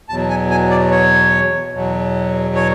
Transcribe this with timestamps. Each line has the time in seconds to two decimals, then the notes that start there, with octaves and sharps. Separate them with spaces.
0.09 E2 B2 F#3 A5
0.29 G#5
0.50 G#5
0.70 D5
0.91 C#5
1.73 E2 B2 F#3
2.55 C#5